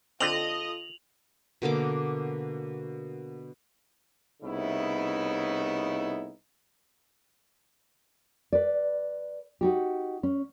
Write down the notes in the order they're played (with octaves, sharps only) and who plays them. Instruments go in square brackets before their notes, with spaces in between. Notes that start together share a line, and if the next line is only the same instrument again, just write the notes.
[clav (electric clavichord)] D3 C4 [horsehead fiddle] F4 A4 [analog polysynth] D#5 [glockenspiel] F7 F#7
[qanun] B2 D3 A#3 D6
[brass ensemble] C2 A2 C#3 B3 D#4 E4
[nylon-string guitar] B4 D5
D#4 F#4 G4
C#4